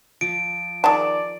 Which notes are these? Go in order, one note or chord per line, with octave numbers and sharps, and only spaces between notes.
F3 D7
D#3 G#4 D5 A5